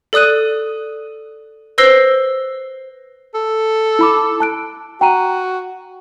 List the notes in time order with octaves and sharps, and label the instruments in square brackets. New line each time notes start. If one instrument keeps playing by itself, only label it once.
[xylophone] A4 D5 D#6 F#6 D#7
B4 C5 E6 A#6 C7 G7
[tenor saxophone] A4
[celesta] E4 B5 D6
A5 F#6 D7
[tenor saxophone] F#4 [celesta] G5 A#5 D#7